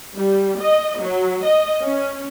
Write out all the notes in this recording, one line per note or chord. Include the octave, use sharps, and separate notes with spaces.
G3
D#5
F#3
D#5
C#4